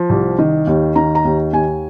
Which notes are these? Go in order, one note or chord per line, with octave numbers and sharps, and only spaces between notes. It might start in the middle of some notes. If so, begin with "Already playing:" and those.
Already playing: F3
C2
D#3
D#2
D#3 A#5
A#5
D#2
D#2 G#5